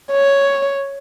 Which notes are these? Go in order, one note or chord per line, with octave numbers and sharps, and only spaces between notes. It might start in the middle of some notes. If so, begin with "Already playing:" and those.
C#5